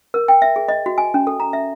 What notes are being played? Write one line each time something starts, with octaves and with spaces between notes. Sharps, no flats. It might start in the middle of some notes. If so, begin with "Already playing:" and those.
A#4
G5
E5
G#4
D#5
F#4
G#5
C#4
A4
A#5
E5